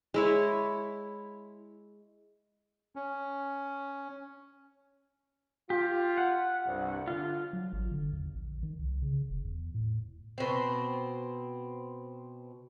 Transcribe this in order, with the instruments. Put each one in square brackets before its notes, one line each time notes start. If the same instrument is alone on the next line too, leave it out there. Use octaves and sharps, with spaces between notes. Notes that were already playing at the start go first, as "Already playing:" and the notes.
[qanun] G#3 E4 C#5
[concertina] C#4
[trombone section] F4 [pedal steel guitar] G4
[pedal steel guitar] F#5
[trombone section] C2 G2
[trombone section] D3 [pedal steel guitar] F4
[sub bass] F#3
G#1
D3
E2
A#1
D#3
C2
C#3
E1
E2
A2
[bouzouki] B2 C4